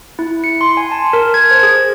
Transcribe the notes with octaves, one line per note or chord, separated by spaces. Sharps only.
E4
C#7
C6
G#5
A5
A#4
G#6
C5
G#4